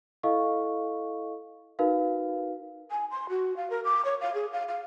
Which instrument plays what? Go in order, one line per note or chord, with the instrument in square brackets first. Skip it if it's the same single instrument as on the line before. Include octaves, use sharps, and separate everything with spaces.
[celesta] E4 A4 D#5 F5 C#6
D#4 F#4 A#4 B4 F5
[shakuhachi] G#5
C6
F#4
F5
A#4
D6
C#5
F5
G#4
F5
F5